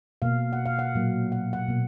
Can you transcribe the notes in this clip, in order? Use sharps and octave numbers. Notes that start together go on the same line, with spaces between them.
B2 A#3 F5
F#5
F5
F#5
A#2 F#3 A#3
F#5
F#5
B2 A#3